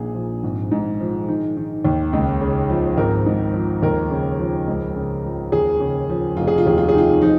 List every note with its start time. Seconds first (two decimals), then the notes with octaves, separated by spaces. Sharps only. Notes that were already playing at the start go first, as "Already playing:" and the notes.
Already playing: A#1 A#2 D#3 G#4
0.15 F3
0.43 G#1
0.71 G#2
1.00 F3
1.28 D#3
1.57 D#3
1.85 D#2
2.13 C#2
2.41 C#3
2.70 F3
2.97 G#1 A#4
3.26 G#2
3.54 F3
3.82 D#2 A#4
4.10 C#3
4.39 F3
4.67 C#2
4.96 C#3
5.25 F3
5.52 D#2 G#4
5.80 C#3
6.09 F3
6.37 F1 F4
6.47 G#4
6.58 F4
6.66 D#2 G#4
6.78 F4
6.89 G#4
6.94 D#3 F4
7.22 F3 D#4